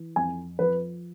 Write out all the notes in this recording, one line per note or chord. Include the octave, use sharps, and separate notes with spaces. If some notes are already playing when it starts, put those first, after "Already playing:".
Already playing: E3
F2 G#5
F3 B4